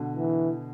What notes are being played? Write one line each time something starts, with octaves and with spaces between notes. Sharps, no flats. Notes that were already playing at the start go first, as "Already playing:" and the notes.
Already playing: B2 D3
E3